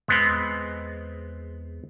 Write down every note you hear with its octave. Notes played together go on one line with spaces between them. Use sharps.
E2 G#3 B3 C4